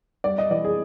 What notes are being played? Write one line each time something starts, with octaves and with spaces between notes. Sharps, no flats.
G3 D5
D#5
E3 D5
G#4